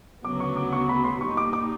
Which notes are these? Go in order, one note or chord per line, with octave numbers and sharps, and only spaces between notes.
D2 C#3 F#3 B3 D6
C#6
D6
C#6
B5
C6
A#2 G3 A#3 D#4 C#6
D6
D6